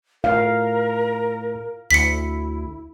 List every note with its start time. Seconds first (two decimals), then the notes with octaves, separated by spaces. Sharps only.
0.24 A2 A#4 F5
1.91 D2 E4 B6 C#7